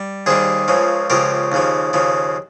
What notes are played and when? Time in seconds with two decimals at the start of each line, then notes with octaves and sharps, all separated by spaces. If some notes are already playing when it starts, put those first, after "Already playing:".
Already playing: G3
0.26 D#2 D#3 G3 G#4 C5
0.68 C#2 C#3 F3
1.10 C#2 C#3 F3 G4 A#4
1.52 D#2 C#3 F3
1.93 D#2 C#3 F3